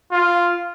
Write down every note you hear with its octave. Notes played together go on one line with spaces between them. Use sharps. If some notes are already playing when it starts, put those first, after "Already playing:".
F4